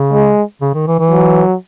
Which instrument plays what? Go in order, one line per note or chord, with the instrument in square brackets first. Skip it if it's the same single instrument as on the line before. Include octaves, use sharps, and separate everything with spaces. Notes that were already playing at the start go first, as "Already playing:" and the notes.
Already playing: [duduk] C#3
[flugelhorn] G#3
[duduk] C#3
D#3
E3
E3
[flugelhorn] F#3